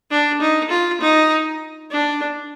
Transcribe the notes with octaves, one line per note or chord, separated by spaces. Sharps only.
D4
D#4
F4
D#4
D4